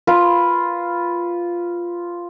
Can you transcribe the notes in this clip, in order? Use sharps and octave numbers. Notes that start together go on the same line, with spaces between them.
F4 B4